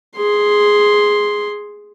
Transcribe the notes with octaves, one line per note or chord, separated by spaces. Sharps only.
G#4 C6